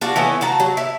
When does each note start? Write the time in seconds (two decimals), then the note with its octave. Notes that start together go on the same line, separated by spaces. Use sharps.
0.01 D4 F4 F#4
0.16 E3 A3 B3 C#4
0.41 F4 F#4 A5 A#5
0.60 F#3
0.77 E4